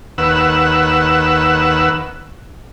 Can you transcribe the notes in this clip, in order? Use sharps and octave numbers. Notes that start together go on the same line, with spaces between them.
D#2 B4 F#5 E6